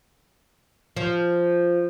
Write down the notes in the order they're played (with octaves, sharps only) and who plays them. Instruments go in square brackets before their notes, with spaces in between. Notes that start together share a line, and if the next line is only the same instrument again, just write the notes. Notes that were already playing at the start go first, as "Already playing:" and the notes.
[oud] F3